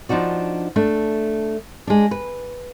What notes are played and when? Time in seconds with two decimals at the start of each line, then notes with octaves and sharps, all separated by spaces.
0.09 F3 D4 D#4 F#4 D5
0.76 A3 D4
1.87 G#3 D4
2.11 B4